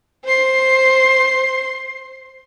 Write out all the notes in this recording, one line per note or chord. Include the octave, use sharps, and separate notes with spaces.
C5 C6